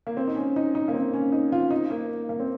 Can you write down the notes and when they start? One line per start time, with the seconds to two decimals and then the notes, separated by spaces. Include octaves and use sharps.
0.07 A#3
0.17 C4
0.27 D#4
0.36 C#4
0.56 D#4
0.75 D#4
0.88 A#3
0.94 C4
1.13 C#4
1.32 D#4
1.52 F4
1.70 D#4
1.90 A#3
2.29 A#3
2.40 C4